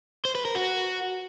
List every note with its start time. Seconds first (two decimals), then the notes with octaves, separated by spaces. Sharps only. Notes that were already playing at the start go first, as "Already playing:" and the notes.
0.25 C5
0.35 B4
0.45 A#4
0.55 F#4